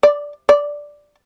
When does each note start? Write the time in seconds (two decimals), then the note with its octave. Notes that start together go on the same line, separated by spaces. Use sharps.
0.03 D5
0.49 D5